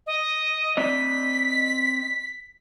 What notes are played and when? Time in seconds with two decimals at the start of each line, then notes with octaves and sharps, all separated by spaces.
0.07 D#5
0.77 C4 D5 D#5 B6